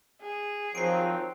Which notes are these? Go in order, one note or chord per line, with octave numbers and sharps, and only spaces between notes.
G#4
D#3 F3 F#3 C4 C7 D7